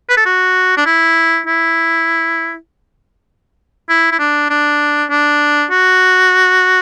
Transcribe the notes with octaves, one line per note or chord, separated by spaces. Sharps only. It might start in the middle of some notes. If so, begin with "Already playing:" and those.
B4
A4
F#4
D4
E4
E4
E4
E4
D4
D4
D4
F#4